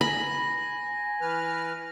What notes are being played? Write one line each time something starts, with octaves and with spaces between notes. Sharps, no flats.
G#5 B5 A#6
E3 B4 F6